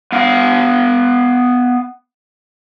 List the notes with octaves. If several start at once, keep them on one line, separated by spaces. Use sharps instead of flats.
B3 F5